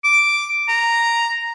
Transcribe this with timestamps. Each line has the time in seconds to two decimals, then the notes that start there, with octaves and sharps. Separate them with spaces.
0.04 D6
0.68 A#5